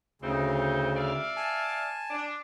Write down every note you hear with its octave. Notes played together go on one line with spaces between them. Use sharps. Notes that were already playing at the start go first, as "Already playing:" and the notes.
D2 C#3 C4 D#4
D5 E5 F5
G#5 A5
D4